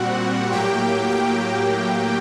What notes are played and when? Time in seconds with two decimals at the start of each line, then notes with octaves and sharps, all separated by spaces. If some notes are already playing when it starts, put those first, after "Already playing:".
Already playing: A#2 G3 C4 F#4 F#5
0.52 A2 F#3 A#3 G4 G5
1.10 G4 G5